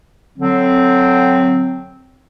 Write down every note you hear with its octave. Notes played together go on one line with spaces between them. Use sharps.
D3 F#3 C4